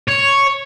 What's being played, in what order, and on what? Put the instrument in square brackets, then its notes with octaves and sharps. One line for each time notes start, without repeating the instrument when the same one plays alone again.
[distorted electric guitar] C#5